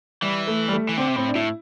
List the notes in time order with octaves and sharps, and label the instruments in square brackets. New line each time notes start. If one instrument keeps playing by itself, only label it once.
[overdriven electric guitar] E3 [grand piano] G3
[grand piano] A3
G3
A3
[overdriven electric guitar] E3
[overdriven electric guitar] D3 [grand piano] C4
[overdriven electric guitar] C3
[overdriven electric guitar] A2 [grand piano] C4
[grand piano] D4
[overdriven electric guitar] A2 [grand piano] E4